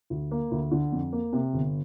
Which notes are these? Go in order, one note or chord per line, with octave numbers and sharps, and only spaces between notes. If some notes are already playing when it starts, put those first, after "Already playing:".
D2
A#3
D2
D3
F2
A#3
C3
G1